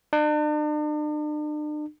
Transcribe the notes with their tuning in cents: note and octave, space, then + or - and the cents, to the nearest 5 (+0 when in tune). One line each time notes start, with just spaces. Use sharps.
D4 +45